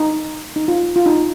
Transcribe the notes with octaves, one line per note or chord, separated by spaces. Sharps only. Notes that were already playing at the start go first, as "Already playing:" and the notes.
Already playing: D#4
D#4
F4
F4
D#4